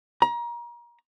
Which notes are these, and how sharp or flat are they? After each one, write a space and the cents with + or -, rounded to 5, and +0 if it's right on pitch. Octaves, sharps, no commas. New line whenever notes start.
A#5 +30